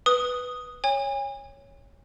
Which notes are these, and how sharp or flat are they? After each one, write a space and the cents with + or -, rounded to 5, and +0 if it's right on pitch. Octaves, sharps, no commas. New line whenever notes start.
B4 +0 D#6 +0
C#5 +0 G#5 -35